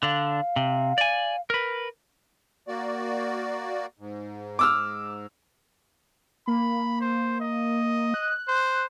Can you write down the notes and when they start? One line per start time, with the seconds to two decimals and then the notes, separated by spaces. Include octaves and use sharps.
0.03 D3 D4 F5
0.56 C3
0.98 D5 G#5
1.50 A#4 B4
2.67 A#3 F#4 D5
3.99 G#2
4.59 D6 E6 F6
6.47 A#3 B5
7.01 C5
7.40 D#5
8.14 F#6
8.48 C5